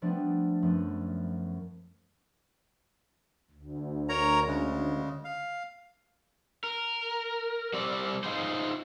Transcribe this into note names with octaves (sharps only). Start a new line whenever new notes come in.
F3 G3 A3 B3 D4
F#2 F3 A3 B3
D2
A#4 C#5 A#5
C#3 G#3
F5
A#4
G3 C4 D5
D#4 F4 G#4 C5